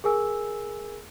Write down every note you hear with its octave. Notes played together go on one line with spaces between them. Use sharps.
G#4 A#4 G#5 E6